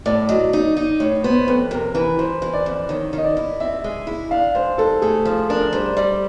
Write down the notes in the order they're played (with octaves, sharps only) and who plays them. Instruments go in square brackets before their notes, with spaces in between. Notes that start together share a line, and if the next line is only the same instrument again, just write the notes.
[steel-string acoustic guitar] A2 [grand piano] D5
[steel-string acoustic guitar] F#3 [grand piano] D#5
[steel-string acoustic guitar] D#4
D#4
[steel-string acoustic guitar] A2 [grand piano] C#5
[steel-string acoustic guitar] B3 [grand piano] C5
[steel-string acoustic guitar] F2 [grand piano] B4
[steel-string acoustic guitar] C3 [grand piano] A#4
[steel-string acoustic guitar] E3 [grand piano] B4
[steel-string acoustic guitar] E3 [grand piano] C5
[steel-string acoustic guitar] E3
[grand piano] D5
[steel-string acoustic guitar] F2
[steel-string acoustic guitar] D#3 [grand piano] C#5
[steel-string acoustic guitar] D#3 [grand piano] D#5
[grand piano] D5
[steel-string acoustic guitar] E4
[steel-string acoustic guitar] C4 [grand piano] E5
[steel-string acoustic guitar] G#3
E4
[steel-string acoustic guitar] D4 [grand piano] F5
[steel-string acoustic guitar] G#2 [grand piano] C5
[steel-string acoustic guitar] G#2 [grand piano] A4
[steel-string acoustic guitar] A3 [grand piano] G#4
[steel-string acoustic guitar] F3
[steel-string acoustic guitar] D4 [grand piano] A#4
[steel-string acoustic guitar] G3 [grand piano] C5
[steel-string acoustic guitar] G3 [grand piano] D5